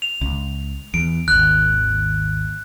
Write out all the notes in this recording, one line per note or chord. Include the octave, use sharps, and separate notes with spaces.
F7
C#2
E2 D7
G#1 D#2 F#6